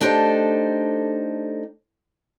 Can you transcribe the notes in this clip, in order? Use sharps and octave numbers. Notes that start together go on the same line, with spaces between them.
A3 D4 D#4 G4 A4 C5